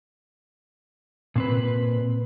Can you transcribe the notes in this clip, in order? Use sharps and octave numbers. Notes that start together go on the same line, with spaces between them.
A#2 C4 B4